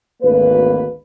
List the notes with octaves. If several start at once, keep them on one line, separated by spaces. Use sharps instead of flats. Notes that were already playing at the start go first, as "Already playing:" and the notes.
G#1 D2 A#3 B4